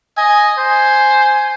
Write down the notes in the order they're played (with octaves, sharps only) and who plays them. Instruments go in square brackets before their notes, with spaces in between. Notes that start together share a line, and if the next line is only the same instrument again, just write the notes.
[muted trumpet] D#5 [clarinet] G#5
[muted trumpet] C5 [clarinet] G#5